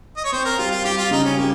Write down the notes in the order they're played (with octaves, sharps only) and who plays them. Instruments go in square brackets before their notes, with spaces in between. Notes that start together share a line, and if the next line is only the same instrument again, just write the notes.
[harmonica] D#5
C#5
[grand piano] C4 [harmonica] C5
[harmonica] A#4
[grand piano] G3 [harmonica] F4
[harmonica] F4
[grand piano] G3 [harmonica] G4
[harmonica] F4
[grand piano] C#3 [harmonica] D#4
[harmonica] C#4
[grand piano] G3 [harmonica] A#3